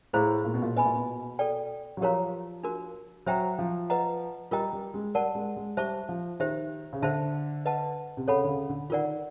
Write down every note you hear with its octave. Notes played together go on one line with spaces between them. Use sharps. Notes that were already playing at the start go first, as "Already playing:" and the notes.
A2 E4 G#4 C5 F5 A#5
A#2
B2
A#2
B2 B4 D#5 G#5 B5
A#2
B2
A4 D5 G5
F#3
F3 G4 A#4 C#5 F5 A#5
D4 F#4 A#4
F#3 C5 E5 G5 A#5
F3
B4 D#5 F#5 A#5
G3 F4 A#4 D#5 G5 A#5
G3
G#3
G3 A#4 D5 F#5 A5
G#3
G#3
G3 C5 E5 A5 C#6
F3
D#3 G4 C5 E5
C#3
D3 C5 E5 A5
B4 D#5 F#5 A5
C3
C#3 A4 C#5 F#5 B5
D3
C#3
D3
D#3 F4 A#4 D5 F#5